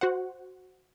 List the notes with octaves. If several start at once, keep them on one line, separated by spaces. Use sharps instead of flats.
F#4 C5 F#5